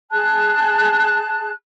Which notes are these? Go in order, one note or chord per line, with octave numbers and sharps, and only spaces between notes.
G#4 A5 F#6